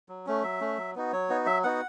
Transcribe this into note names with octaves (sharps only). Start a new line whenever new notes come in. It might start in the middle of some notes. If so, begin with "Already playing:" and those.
F#3
A3 C#4
F#3 E5
A3 C#4
F#3
B3 D#4 F#4
F#3 C#5
B3 D#4 F#4
F#3 E5
B3 D#4 F#4 F#5